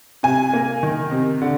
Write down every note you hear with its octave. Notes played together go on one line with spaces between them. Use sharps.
C3 G#5
A#3
D#3
C3
D3